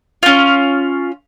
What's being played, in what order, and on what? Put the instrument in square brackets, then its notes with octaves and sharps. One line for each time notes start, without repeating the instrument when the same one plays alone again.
[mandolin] C#4 F4